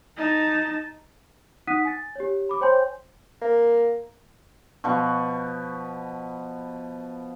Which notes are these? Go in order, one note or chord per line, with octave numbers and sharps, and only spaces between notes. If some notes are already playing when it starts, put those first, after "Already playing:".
D#4 A5
D#4 F#5 D#6 F#6 B6 D#7
G#5 A6
G4 C#5
B5 D6
C5 C#5 G5 G#5 C6 G6
A#3
B2 F3 B4 C#6